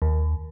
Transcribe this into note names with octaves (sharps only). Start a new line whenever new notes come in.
D#2